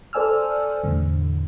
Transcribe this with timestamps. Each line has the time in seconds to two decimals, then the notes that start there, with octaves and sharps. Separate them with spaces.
0.13 A4 C5 D5 G#5 E6 F6
0.83 E2 A2 D3